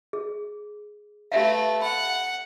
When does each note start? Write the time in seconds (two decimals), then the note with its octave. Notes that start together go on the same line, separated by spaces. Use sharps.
0.13 G#4
1.32 A3 G4 B4 E5 F5
1.82 F#5 B5